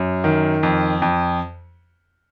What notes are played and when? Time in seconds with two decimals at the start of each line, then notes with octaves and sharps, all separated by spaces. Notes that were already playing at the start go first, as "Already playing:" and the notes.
Already playing: F#2
0.24 D#3
0.63 F2
1.02 F2